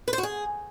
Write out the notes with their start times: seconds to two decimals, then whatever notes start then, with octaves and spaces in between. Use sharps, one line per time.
0.08 B4
0.13 C5
0.18 F#4
0.23 G#4